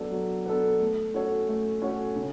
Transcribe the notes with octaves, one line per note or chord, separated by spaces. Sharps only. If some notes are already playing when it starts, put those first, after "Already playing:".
Already playing: F#3 B3 D4 A4
F#3
B3 D4 A4
A3
C#4 F#4 A4 C#5
A3
C#4 F#4 A4 C#5
C#3